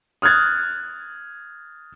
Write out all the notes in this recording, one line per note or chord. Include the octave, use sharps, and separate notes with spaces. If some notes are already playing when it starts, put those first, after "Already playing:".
D#6 F6 F#6 G#6 A6